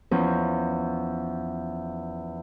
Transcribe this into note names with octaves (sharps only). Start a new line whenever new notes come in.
E2 F3 C#4